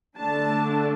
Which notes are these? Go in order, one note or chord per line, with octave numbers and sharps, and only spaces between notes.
D3 A3 D4 A5